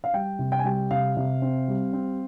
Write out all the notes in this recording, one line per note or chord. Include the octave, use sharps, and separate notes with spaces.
F5
G3 G5
C3
G5
G#5
G3 G5
C3 F5
C3
C4
G3
C4